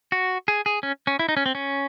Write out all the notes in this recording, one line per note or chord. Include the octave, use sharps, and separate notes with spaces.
F#4
G#4
G#4
C#4
C#4
E4
D#4
C#4
C4
C#4